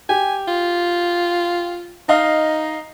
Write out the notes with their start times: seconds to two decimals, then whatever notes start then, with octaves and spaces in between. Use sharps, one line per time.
0.09 G4 G#5
0.48 F4
2.09 D#4 D#5 F5